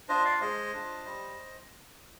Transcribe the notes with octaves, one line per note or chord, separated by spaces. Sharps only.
D4 F4 C5 D#5
D5 F5
G#3 C5 D#5
D4 F4
G3